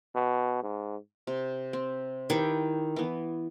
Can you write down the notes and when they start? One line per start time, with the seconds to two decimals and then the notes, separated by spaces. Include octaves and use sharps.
0.15 B2
0.63 G#2
1.27 C3
1.73 C4
2.30 D#3 E4 G4 B4
2.96 E3 B3